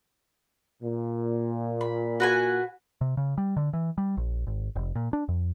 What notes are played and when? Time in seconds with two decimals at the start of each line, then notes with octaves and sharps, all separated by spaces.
0.83 A#2
1.81 B5
2.20 F#4 B4 G#5
3.01 C3
3.17 C#3
3.38 G3
3.57 D3
3.73 E3
3.98 G3
4.17 A#1
4.47 G#1
4.76 F1
4.95 A#2
5.13 D4
5.28 F2